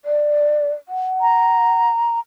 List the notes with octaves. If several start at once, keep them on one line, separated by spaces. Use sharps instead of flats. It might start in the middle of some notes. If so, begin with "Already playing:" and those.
D5
F#5
A#5